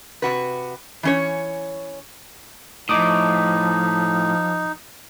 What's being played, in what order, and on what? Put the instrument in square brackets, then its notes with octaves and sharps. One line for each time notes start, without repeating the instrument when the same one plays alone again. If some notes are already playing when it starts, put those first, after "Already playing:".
[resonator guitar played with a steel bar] C3 F#4 B4
E3 C#4 C#5
[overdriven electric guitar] A2 [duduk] F3 [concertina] D#4 [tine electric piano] D#5 D6 D#6